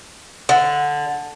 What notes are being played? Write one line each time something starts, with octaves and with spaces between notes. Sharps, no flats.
D3